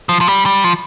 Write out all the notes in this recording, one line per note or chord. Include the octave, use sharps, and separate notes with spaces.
F3
F3
G3
G3
F3